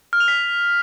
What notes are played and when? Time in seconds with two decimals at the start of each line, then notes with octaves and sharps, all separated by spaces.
0.13 F6
0.20 F7
0.28 B6